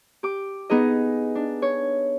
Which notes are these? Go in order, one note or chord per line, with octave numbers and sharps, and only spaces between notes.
G4 D6
B3 D#4 G#4 D#5
D4
C#5